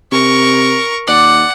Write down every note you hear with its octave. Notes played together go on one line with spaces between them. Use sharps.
C3 A#4 C#6
D#2 D5 F#5